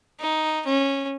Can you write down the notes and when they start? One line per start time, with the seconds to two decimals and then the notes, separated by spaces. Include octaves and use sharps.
0.20 D#4
0.66 C#4